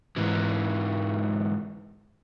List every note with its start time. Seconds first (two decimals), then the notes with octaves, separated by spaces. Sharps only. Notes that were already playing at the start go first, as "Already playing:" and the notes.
0.16 G#2 E3